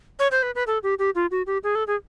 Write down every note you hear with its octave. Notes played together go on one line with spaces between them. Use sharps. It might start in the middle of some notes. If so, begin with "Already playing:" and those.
C#5
C5
B4
B4
A4
G4
G4
F4
F#4
G4
G#4
A4
G#4